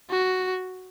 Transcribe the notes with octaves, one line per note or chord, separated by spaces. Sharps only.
F#4